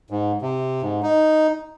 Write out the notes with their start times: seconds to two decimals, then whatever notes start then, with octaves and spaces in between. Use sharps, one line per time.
0.10 G#2
0.42 C3
0.82 G#2
1.03 D#4